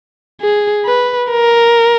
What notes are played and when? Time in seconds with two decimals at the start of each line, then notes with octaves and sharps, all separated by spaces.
0.41 G#4
0.85 B4
1.31 A#4